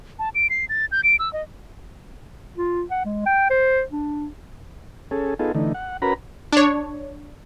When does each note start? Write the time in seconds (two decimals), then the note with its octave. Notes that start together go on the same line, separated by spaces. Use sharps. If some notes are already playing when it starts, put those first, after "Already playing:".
0.19 A5
0.35 D7
0.50 C7
0.69 A6
0.92 G6
1.04 D7
1.19 E6
1.33 D#5
2.57 F4
2.90 F#5
3.05 G#3
3.26 G5
3.50 C5
3.91 D4
5.11 C#4 G#4 A4
5.39 B3 D#4 F4 G#4 A4
5.55 D3 E3 A3 D#4
5.74 F#5
6.02 C#4 F#4 A#4 B4 A#5 B5
6.52 D4 C#5